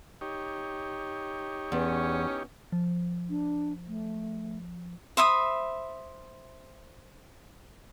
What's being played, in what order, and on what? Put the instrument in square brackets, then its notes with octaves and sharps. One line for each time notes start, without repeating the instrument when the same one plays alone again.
[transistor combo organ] D#4 G4 C#5
[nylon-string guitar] E2 [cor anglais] C#4
[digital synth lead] F3
[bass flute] D4
A3
[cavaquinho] C5 E5 B5 D#6